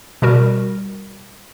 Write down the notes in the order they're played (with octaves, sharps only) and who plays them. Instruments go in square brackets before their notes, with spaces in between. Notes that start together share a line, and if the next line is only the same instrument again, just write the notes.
[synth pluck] B2 G3 F#4 A#4